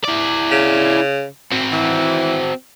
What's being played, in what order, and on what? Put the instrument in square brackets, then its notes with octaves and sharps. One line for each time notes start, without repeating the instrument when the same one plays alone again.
[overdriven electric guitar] E4 D5
[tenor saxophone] C#3
[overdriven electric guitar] C4 F#4
[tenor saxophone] E3